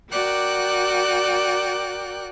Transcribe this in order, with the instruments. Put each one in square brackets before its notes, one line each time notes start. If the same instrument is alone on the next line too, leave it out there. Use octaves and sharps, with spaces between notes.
[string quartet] F#4 A#4 D5 G5 D6 F#6